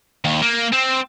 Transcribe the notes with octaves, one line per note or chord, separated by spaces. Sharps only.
D#2
A#3
C4